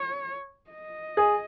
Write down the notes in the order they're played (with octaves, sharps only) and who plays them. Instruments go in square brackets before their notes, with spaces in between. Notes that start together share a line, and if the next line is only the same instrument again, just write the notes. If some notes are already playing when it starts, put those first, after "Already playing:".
Already playing: [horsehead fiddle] C#5
D#5
[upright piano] G#4